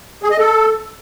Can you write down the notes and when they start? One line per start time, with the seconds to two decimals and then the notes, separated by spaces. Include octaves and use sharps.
0.23 G#4
0.31 D#5
0.39 A4